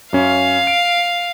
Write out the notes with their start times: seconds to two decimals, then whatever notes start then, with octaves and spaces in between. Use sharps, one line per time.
0.13 F#2 C#4 F5
0.67 D7